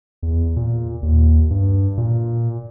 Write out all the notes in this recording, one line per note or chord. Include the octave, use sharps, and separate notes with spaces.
E2
A#2
D#2
G2
A#2